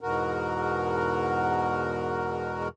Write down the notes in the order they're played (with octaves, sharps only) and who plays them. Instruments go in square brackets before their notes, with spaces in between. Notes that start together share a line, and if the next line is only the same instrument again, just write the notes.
[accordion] E2 G#2 B2 F#4 A#4